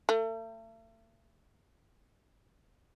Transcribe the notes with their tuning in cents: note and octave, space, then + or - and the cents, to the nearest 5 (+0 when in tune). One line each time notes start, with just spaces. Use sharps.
A3 +40